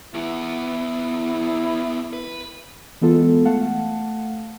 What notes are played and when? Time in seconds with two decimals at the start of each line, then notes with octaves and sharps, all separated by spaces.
0.14 E2 B3 E4
2.13 B4
3.01 E3 G#3 B3 F4 A4
3.45 A3 F5 F#5 A5